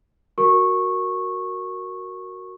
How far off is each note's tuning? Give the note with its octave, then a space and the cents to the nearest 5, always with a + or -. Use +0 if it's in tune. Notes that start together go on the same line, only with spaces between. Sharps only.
F#4 +0 A#4 +0 C#6 -15